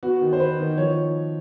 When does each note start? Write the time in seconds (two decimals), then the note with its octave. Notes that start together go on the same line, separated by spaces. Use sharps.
0.03 B3 F#4
0.21 D#3
0.33 C5
0.40 B3 B4
0.59 D#3
0.77 F3 C#5